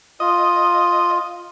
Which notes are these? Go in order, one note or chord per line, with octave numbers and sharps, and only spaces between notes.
F4 D#5